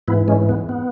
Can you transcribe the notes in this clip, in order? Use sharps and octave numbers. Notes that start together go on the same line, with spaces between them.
G#2 E3 B3 E4
G#3 C#4
B3
B3